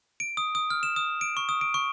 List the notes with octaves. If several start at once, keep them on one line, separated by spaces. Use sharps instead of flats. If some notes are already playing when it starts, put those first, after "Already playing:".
D7
D#6
D#6
F6
E7
D#6
D7
C#6
D#6
D7
C#6